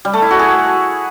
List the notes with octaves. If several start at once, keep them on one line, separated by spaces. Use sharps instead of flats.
G3
A3
E4
F#4
G#4